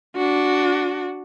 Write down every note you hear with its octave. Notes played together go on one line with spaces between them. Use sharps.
D4 F#4